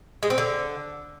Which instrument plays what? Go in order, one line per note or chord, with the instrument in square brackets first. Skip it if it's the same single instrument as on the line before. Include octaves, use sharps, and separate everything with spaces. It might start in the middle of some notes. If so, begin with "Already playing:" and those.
[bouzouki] G#3
C4
D3